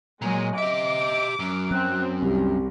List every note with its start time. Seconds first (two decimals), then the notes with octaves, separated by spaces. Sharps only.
0.22 A#2 F#3 G#3
0.58 G4 D#5 E5 D6
1.39 F#2
1.71 F#3 C4 F#6
2.22 C2 C4 G4